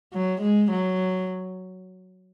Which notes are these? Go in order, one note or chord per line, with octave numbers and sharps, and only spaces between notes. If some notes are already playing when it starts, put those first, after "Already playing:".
F#3
G#3
F#3